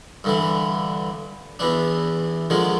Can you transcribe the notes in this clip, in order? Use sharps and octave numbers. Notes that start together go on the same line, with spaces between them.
G2 D3 E3
E2 E3 D4
D3 D#3 F3 G#3